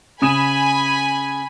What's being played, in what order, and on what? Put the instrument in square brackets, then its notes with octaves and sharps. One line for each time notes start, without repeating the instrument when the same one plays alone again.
[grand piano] C#3 D#6 E7 [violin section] G#5 B5